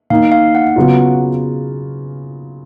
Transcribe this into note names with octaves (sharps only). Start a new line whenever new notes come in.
D#3 A#3 D#4 F5
F5
F#5
C#3 F#3 B3 F4